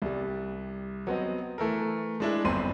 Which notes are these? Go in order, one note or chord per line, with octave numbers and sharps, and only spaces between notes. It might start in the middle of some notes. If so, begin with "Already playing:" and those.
C2 G3
F#3 B3 C4 D#5
E3 A3 A4 A#4
G#3 D4 E4
G1 F#2 C4 B5 C6 D#7